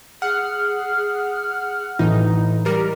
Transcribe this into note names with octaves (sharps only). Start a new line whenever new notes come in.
G#4 F#5 F6
A2 E3 D#4
G3 G4 A#4